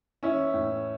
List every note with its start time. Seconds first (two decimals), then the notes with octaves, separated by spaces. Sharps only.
0.23 E3 C#4 E4
0.54 A2